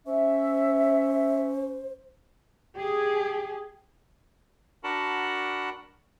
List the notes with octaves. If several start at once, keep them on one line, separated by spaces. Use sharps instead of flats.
C#4 C5 E5
G4 G#4
D4 F#4 A#4 F#5 A5 B5